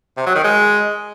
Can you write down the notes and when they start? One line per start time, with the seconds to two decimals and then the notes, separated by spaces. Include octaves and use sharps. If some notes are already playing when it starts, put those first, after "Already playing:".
0.17 C3
0.26 F#3
0.35 D#3
0.44 G#3